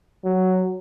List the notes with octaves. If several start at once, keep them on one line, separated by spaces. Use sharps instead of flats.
F#3